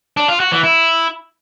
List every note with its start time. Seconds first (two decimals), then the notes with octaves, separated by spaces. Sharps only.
0.17 D4
0.28 F4
0.40 F#4
0.52 E3
0.63 E4